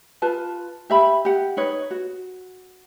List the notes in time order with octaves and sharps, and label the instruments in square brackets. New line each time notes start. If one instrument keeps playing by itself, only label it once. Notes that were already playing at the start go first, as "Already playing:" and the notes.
[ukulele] F4 B4 A5
G4 E5 B5
G4 F#5
D#4 B4 C#5
F#4